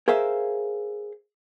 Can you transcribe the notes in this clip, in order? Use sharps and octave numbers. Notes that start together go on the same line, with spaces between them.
G#4 A#4 C5 E5 F5